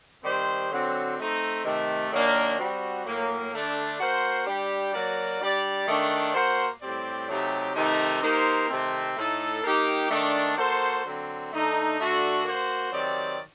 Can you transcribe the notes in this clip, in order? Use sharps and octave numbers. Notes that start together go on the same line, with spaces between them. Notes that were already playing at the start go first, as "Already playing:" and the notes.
D#3 G3 C4 G4 C5
D3 F#3 C4 F#4
A3 C4 D#4
C3 D#3 A3
D#3 F#3 A#3 D4
G3 C4 F#4
A2 F#3 A#3
D3 A3 D4
A#3 F#4 C5
G3 D4 G4
F#3 A#3 F#4 A#4 D5
G3 D4 G4 D5
D#3 A3 D4
A#3 F#4 C5
A2 G3 C4 G4 D5
C3 F#3 A3 D#4 G4
C3 D#3 A3 D#4
A#3 D#4 G4 C5
C3 D#3 A3 C4
A2 A3 D#4 A4
A#3 D#4 G4
D#3 A3 D4
A#3 F#4 A4 C5
D3 F#3 C4
D3 A3 D#4 A4
D3 A3 D4 F#4
A#3 F#4 C5
D#3 F#3 C4 G4 D5